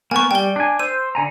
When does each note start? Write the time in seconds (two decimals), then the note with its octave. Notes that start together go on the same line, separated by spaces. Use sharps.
0.11 A#3 B3 G#5 C#6
0.31 G3 G5 G7
0.56 D4 G#5
0.79 C5 E6 D#7
1.15 D3 G#5 A#5